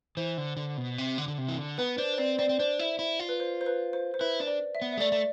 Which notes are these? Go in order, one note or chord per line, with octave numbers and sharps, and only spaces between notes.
E3 C5
D3
D3
B2
C3
D3
D3
C3
E3
D3
B3 B4
D4 C5
C5
C4 D5
C4 D5
C4
D4 C5
E4
E4
F4
B4
C5
C5
B4
C5
C5
E4 B4
D4
D5
E5
B3
E5
G#3
A3 D5
A3 D5